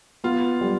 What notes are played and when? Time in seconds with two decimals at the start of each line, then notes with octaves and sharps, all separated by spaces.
0.24 B3 F4
0.61 G3